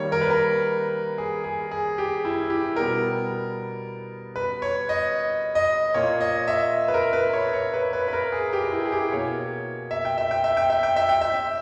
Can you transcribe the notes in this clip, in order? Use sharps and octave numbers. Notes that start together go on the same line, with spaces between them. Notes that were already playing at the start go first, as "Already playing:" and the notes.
Already playing: D#3 G3 A#3 C#5
A#4
B4
A#4
G#4
G#4
G#4
G4
E4
E4
G4
B2 G3 B3 A#4
B4
C#5
D#5
D#5
A#2 A#3 C#5
D#5
E5
B4
A#4
B4
C#5
C#5
B4
B4
B4
A#4
G#4
G4
G4
E4
G#4
G4
B2 A#3 C#5
E5
G5
E5
G5
E5
G5
E5
G5
E5
G5
E5